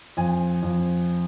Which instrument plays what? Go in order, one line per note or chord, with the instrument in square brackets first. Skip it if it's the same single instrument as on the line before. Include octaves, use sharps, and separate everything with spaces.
[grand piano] F2 G#5
F2